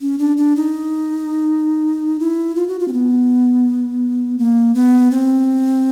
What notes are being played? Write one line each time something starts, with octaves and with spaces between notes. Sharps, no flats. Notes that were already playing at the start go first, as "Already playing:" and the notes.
C#4
D4
D4
D#4
E4
F4
F#4
F4
C4
B3
A#3
B3
C4